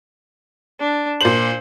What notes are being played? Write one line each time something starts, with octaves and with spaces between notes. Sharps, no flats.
D4
A#2 C5 F#7